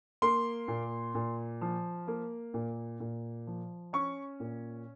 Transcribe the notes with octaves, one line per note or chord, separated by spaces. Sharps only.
A#3 C6
A#2
A#2
F3
A#3
A#2
A#2
F3
C#4 C#6
A#2